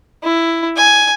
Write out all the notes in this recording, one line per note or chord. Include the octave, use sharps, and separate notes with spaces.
E4
G#5